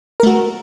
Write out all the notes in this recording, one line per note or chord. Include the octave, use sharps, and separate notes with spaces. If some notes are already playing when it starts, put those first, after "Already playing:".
A3 F#4 A#4